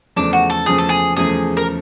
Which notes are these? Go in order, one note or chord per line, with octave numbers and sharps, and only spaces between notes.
E2 C#3 F3 A3 D4
F#4
A4
E2 C#3 F3 A3 G#4
A4
G#4
E2 C#3 F3 A3 G#4
A#4